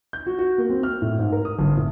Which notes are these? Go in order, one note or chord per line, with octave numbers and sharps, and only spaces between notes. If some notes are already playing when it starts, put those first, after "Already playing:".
G6
F#4
F#4
A#3
C4
F6
A2
G#2
A#4
D#6
G1
A2